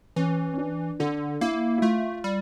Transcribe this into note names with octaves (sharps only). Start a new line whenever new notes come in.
E3 C#4
C#4
D4
D3 D4
A#3 E4
E4
A3 F4
G3